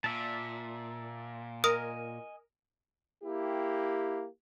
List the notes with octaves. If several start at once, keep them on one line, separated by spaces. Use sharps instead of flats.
A#2 D5 E5 A5
A#4 D#5 G#5 D#6
A#3 E4 G4